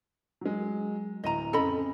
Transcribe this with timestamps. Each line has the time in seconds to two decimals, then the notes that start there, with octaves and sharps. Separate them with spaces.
0.41 F#3 G#3
1.24 D1 D#5 A#5 D#7
1.53 F2 C#3 A4 D#5 B5